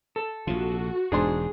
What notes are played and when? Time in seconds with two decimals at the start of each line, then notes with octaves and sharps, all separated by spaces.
0.16 A4
0.47 A#1 C3 F4 F#4
1.12 E1 E2 G#2 D4 G#4 C6